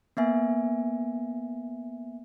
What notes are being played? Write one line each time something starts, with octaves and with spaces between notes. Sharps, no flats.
A#3 B3 E5 G#5